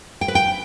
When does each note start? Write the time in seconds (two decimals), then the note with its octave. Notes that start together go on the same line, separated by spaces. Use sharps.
0.21 G5
0.28 B4
0.35 G5